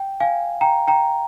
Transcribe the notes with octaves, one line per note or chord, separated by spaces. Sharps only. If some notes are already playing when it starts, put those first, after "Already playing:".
Already playing: G5
F5 G#5
G5 A#5
G5 A#5